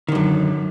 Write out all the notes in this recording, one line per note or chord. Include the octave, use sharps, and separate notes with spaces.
F#2 D3 D#3